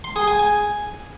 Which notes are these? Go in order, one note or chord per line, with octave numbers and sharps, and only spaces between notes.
C6
G#4
G#5
G#5